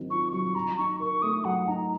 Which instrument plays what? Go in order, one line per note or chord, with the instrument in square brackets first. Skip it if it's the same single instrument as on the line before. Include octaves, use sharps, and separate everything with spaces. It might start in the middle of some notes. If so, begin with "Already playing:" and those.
Already playing: [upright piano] D#3 F#3 C4
[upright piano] F4 [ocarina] C#6
[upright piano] F#3 [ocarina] C#6
[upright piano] F#3 [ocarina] A#5
[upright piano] D#4 [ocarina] C#6
[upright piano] A#4 [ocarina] C#6
[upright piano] A3 [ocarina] D#6
[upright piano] F#3 [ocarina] F#5
[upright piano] D#4 [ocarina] A#5